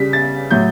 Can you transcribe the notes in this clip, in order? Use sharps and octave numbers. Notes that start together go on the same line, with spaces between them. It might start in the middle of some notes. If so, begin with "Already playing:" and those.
Already playing: C#3 G3 B6
A6
A2 F#3 G6